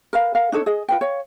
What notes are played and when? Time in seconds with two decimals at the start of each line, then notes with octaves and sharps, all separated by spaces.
0.13 A#4 B4 F5
0.35 A#4 F5 F#5
0.52 D4 D#4 A4 C#5
0.66 G#4 D#5
0.88 F4 B4 G5
1.01 C#5 F5